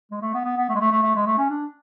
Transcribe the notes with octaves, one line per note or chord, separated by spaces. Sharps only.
G#3
A3
B3
B3
B3
A3
G#3
A3
A3
A3
G#3
A3
C#4
D4